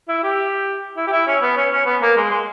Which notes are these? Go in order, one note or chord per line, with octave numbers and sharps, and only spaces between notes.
E4
G4
E4
G4
E4
C#4
B3
C#4
C#4
B3
A#3
G#3
G#3